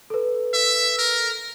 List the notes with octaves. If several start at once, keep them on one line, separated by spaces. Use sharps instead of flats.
A4 B4
E5
A#4